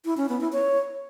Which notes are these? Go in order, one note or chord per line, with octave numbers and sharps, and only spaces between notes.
E4
C#4
B3
E4
C#5